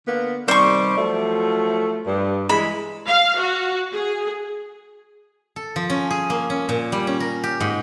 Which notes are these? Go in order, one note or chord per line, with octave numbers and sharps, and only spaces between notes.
D3 A#3 B3
C3 D#3 G3 C5 C#6
F3 F#3 A3
G2
E3 G#3 B5
F5
F#4
G#4
A4
F3
C#4
G#4
A#3
C#4
A#2
G3
C#4
A#4
G4
G#2